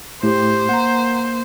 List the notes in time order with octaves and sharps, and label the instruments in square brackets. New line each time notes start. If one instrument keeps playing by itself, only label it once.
[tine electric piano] A2 A3 [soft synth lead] G4 [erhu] C5
[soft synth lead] A#3 [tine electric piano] F#5 A#5